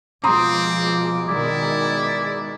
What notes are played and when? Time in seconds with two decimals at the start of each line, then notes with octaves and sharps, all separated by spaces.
0.24 B2 F3 G#3 C4 A#5 C6 D6 D#6
1.29 B2 D#3 G#3 E4 D5